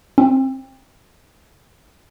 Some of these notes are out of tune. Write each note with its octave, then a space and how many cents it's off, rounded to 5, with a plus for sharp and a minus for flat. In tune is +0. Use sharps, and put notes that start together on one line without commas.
C4 +25